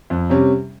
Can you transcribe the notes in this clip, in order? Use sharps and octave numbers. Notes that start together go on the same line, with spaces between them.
F2
C3 G3 C#4